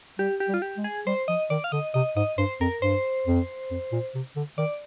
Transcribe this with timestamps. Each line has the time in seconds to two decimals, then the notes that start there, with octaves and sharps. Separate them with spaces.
0.19 G3 G4
0.40 G4
0.48 G3
0.54 F4
0.62 G4
0.77 G#3
0.84 G#4
1.07 G3 C5
1.28 F3 D#5
1.50 D#3 D5
1.64 F5
1.72 D3 D#5
1.94 C3 D#5
2.16 G#2 D#5
2.38 G2 C5
2.61 F2 A#4
2.82 G2 C5
3.27 F2
3.71 F2
3.92 A#2
4.15 C3
4.36 D3
4.58 D#3 D5